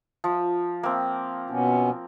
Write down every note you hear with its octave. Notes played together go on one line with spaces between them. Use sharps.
F3
A#3 C4
B2 B3 C#4